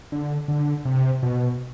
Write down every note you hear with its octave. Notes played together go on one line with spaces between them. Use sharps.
D3
D3
C3
B2